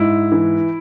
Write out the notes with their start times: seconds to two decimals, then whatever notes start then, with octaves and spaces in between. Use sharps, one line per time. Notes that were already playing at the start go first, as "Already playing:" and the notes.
Already playing: G#2 E4
0.32 E3